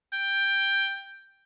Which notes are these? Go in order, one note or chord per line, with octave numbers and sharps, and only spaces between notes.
G5